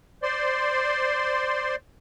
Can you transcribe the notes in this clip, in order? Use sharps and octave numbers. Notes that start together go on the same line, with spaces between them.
C5 D5 C6